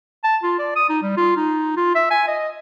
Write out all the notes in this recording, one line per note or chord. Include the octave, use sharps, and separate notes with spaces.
A5
F4
D5
D#6
D#4
G3
F4
D#4
F4
E5
G#5
D#5